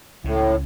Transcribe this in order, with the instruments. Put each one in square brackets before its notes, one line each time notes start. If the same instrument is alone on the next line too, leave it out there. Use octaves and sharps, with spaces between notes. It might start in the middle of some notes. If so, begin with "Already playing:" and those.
[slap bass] C#2 C#3 [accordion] A2